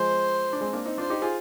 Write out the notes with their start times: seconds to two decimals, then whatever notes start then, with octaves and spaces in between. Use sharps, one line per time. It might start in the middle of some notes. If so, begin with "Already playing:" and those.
Already playing: F3 G#3 C5
0.53 D4
0.61 G#3 C4
0.73 A#3 D4
0.85 C4 D#4
0.98 D4 F4 C5
1.10 D#4 G4
1.22 F4 G#4